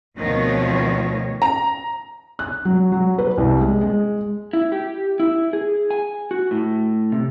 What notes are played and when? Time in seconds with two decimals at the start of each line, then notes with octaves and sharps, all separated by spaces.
0.17 D2 B2 D#3 F3 C4 C#5
1.42 A#5
2.39 F#6
2.65 F#3
2.92 F#3
3.18 B4
3.38 C2
3.61 G#3
3.81 G#3
4.53 E4
4.72 G4
5.20 E4
5.53 G#4
5.91 G#5
6.31 F#4
6.51 A2
7.12 C3